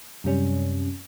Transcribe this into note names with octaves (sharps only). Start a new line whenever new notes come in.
F#2 C3 G3 C#4